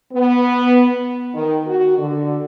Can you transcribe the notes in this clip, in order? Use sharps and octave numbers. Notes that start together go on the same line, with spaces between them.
B3
D#3
F#4
D3